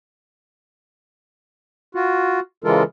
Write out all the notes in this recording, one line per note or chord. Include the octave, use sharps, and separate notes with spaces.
F4 F#4
C#3 E3 G#3 F4 A4 A#4